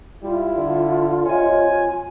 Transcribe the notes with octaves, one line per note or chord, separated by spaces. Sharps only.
G3 E4 F4
D3
C3 C#5 D#5 G#5